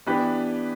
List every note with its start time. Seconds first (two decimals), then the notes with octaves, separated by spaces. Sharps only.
0.06 E3 B3 D4 G4 B4